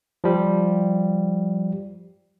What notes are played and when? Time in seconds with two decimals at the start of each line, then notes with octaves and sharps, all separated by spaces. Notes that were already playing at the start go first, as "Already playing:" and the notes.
0.24 F3 G3